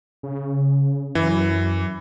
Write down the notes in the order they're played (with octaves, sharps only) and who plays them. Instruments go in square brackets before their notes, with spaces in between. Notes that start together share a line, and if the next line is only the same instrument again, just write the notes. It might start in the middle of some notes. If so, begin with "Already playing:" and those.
[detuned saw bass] C#3
[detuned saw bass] F#2 [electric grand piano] E3